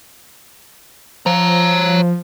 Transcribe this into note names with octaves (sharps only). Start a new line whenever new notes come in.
F3 C#5 A#5